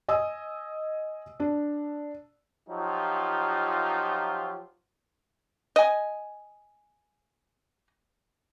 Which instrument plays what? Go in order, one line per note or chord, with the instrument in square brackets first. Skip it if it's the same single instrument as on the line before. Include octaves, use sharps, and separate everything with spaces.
[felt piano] D#5 G#5 D#6 E6
D4
[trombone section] F3 F#3 D#4 F4 G4
[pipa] D#5 G#5